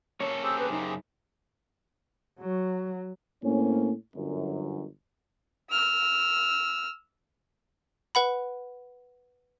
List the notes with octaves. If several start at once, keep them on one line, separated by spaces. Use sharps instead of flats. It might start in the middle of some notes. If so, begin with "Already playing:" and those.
A#3 C#4 A4 C#5
G4 G#4 C5 E6
B4
F#2 C#3 D#4
F#3
A2 A#3 C4 C#4
G1 F#2
E6 F6
B4 F#5 B5